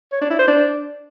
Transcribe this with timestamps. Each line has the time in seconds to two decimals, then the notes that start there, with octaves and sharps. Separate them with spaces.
0.12 C#5
0.21 D4
0.30 E4
0.39 C5
0.48 D4